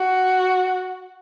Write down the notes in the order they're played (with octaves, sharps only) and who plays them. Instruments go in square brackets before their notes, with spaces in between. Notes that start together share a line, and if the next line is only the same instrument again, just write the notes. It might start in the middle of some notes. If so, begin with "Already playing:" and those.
Already playing: [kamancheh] F#4